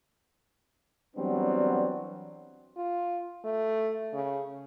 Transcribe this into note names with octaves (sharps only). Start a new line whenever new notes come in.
E3 F#3 G3 B3 C4 D4
F4
A3
C#3